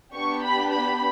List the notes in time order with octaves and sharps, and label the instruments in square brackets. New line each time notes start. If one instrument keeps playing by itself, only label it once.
[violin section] B3 D4 G4 C#6
B5
B5